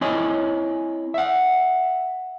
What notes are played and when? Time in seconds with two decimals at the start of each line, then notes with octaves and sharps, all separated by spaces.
0.01 C4 E4 C#5 D#5 G#5
1.14 E5 F#5